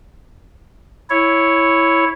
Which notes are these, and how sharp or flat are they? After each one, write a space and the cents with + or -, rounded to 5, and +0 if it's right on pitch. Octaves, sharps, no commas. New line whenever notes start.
E4 +0 C#5 +0